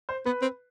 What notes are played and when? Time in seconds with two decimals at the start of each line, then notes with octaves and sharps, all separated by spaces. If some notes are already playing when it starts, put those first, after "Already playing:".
0.09 C5
0.26 B3 B4
0.42 C4